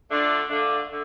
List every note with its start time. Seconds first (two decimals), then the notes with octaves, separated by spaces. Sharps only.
0.09 D3 A3 D4 F4
0.48 D3 A3 D4 F4
0.88 D3 A3